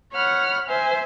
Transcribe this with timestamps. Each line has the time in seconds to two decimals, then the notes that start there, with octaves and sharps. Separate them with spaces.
0.13 C#5 F#5 B5 F6
0.69 C5 E5 G#5